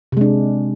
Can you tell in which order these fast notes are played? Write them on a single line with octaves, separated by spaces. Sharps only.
C3 G#3 D4